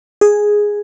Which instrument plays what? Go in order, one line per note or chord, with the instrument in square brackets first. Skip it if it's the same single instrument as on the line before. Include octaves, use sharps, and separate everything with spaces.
[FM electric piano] G#4